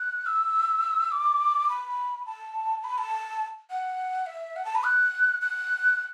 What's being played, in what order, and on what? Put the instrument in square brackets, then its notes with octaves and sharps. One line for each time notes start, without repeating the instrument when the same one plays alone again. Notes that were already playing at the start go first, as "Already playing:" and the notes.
Already playing: [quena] F#6
E6
D6
B5
A5
B5
A5
F#5
E5
F#5
A5
B5
F#6
F#6